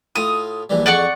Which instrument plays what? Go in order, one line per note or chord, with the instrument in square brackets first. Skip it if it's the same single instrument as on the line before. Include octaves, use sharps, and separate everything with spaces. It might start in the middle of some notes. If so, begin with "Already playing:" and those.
[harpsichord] A2 F4 [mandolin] D#6
[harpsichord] A#1 E3 G3
[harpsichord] F2 G#4 [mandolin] D5 F#5 C#6